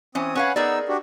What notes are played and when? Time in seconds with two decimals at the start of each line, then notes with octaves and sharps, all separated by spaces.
0.15 E3 C4 C#4 D#6
0.35 C#4 B4 C#5 F5 F#5 G#5
0.56 B3 D#4 G#4 A#4 D5 E6
0.88 D4 F#4 G4